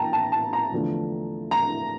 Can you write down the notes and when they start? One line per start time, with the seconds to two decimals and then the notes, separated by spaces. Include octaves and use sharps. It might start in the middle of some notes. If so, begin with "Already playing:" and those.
Already playing: E3 A#3 G5 A5 A#5
0.13 A5
0.32 A5
0.53 A#5
0.72 E2 D3 F3 A3
1.51 A#5